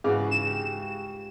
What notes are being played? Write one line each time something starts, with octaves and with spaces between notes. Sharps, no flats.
G#2 C#3 E3 F4 F#4 G#4
E7
G4